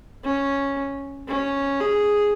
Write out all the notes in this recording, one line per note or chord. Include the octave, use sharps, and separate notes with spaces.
C#4
C#4
G#4